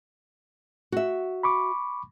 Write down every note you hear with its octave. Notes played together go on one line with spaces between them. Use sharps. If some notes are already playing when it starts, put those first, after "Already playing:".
F#4 E5
B5 C#6 D6